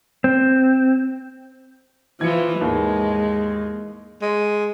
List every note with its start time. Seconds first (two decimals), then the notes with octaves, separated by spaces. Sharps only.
0.24 C4
2.21 E3 F3 G#6 C#7
2.61 D#2 G#2 G#3
4.22 G#3